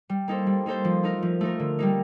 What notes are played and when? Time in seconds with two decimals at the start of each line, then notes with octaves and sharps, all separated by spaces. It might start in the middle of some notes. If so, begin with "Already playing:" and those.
0.09 G3
0.28 A#3 D#4 A4 C5
0.47 G3
0.66 A#3 D#4 A4 C5
0.85 F3
1.03 A3 D#4 A#4
1.23 F3
1.41 A3 D#4 A#4
1.59 D3
1.79 G3 A#3 D#4